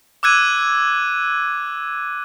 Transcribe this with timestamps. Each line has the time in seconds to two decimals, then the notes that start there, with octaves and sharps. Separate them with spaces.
0.23 D6 E6 F#6 G#6 D#7